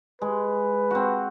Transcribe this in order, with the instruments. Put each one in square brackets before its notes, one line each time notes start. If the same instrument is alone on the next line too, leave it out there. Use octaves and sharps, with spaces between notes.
[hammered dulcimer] G#3 [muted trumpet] B4
[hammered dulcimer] C4 F#4